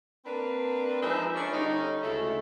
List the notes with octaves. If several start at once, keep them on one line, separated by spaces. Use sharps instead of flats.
A#3 C4 D4 B4
F3 G#3 D#4 B4 C5 E5
C#4 D4
D3 G3 C#4 D#4
D2 C#3 G#3 A3 E4 A4